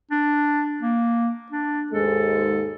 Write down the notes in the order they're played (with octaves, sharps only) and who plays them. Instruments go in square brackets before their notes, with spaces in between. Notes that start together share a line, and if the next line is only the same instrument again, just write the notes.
[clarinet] D4
A#3
D4
[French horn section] D#2 G#2 G#3 [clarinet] A4